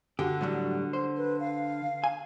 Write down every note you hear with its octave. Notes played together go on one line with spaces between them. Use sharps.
D3 F#4 G4
A2 F#3 G3
C5
B4
F5
G#5